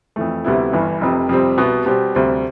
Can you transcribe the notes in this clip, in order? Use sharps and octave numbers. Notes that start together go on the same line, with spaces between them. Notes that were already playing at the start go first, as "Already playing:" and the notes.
F2 E3 A3
D2 C3 G3 B3 E4
G1 G2 E3
F1 F2 C3
F2 C3 G3 C4
C2 B2 B3
B2 G3 C4 G4
D2 C3 G3 C4